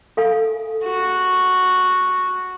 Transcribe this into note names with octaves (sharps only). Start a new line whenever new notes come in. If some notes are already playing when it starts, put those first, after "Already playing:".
A4 F5 G#5
F#4